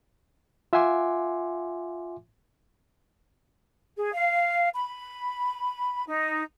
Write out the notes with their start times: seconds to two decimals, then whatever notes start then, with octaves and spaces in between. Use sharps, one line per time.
0.73 F4 E5 F#5 G#5 C6 D6
3.97 G#4
4.13 F5
4.75 B5
6.06 D#4